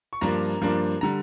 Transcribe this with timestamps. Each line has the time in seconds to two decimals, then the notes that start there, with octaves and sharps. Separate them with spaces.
0.13 C#6
0.21 G2 F3 A#3 D4 A#5
0.61 G2 F3 A#3 D4
1.01 D3 G3 A#5